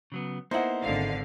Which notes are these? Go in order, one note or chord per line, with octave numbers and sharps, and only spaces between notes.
C#3 F#3 B3
A#3 B3 D#4 E4 C5 F#5
G#1 D3 F5